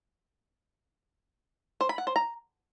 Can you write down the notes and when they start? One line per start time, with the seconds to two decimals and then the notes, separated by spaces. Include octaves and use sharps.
1.81 C5
1.89 B5
1.98 F#5
2.07 C5
2.16 A#5